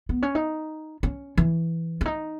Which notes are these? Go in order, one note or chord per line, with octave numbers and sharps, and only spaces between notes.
B3
C#4
D#4
C#4
E3
C#4
D#4